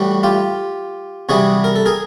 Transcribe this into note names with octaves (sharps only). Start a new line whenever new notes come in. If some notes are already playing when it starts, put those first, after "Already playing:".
Already playing: A2 E3 G3 F#4
F4 G4
C3 E3 G3 F#4 G#4
A#4
A4
G#4 A#4